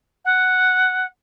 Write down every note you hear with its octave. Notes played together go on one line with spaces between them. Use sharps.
F#5